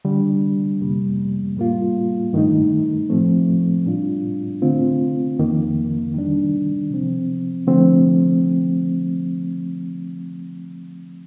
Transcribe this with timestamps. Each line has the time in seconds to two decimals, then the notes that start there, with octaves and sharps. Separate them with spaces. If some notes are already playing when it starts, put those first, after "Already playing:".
0.05 D3 G3 D4
0.80 F2 C3 G3 A#3
1.57 A2 G3 A#3 F4
2.33 G2 D#3 A3 D#4
3.10 A2 F3 A3 C4
3.86 A2 G3 D4 F4
4.62 D3 A3 C4 F4
5.39 F2 D#3 A#3
6.14 D#3 G3 D4
6.90 C3 F3 C4
7.67 D3 F3 A3 C4